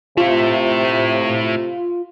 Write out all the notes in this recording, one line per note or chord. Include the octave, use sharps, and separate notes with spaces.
C3 A3 E4 F4